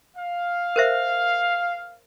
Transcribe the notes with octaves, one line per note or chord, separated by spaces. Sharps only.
F5
A#4 C5 E5